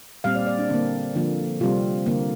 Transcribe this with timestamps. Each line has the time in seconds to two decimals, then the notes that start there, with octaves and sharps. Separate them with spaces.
0.24 A#2 G3 C4 F5
0.35 D5
0.47 D5
0.58 D4
0.69 D3 A#3 C4
1.15 D3 F3 A#3
1.60 C3 G3 C4 F4
2.06 D3 A#3